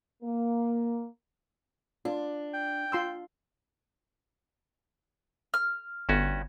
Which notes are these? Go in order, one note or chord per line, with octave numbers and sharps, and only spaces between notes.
A#3
D4 F4
G5
F4 C6 E6
F6
G1 G2 C#4 F#4